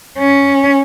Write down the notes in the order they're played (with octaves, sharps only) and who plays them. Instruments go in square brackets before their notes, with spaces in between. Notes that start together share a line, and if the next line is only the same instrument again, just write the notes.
[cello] C#4